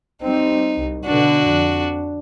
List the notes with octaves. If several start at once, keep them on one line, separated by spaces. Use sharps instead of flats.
G3 C4 D#4
C2
B2 D3 D4 F#4
F2